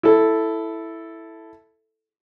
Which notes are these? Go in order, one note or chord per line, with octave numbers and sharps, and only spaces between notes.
E4 A4